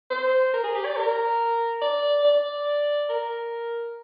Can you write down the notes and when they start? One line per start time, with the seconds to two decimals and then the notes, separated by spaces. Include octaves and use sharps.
0.10 C5
0.53 A#4
0.64 G#4
0.75 G4
0.85 D5
0.96 A#4
1.82 D5
2.24 D5
3.09 A#4